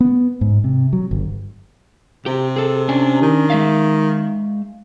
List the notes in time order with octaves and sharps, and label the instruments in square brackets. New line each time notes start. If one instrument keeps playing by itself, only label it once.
[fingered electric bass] B3
G#2
C3
F#3
G1
[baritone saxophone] C3 [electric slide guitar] G4
[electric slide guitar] G#4 A4
C#4 D4 G#5
[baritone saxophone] D#3
[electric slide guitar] G#3 E5 F5